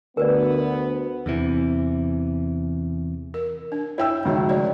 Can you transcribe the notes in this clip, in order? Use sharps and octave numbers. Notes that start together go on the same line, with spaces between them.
D2 B3 A#4 B4 D5
E2 C3 E3
A#4
D4
E4 C#5 G5 E6
C#2 D#3 F3 F#4 E5
A3 C#5 D5